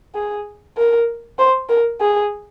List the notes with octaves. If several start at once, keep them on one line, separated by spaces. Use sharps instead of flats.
G#4
A#4
C5
A#4
G#4